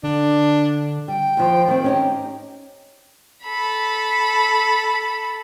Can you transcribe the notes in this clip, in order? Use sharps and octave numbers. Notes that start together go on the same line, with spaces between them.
D3 D4
G3 G5
D#2 F3
D#3 C4
C#4 D#4 G4
A4 B5